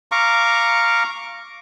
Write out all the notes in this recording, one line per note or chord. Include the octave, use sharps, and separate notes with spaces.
F5 A#5 C#6 D6